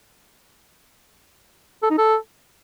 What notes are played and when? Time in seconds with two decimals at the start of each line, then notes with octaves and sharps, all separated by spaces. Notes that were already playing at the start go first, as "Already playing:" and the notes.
1.83 A4
1.90 D#4
1.98 A4